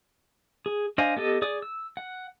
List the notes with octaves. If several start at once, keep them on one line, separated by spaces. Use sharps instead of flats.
G#4
D4 C5 D#5 F5 G#5
B3 G4 A4 D#5
G#4 D5 D#6
E6
F#5